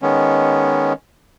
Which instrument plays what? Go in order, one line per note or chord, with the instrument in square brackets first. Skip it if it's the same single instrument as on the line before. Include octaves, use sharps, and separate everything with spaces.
[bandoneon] D#3 G#3 B3 C#4